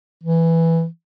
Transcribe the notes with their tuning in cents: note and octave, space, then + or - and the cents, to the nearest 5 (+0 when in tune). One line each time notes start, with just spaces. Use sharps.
E3 +0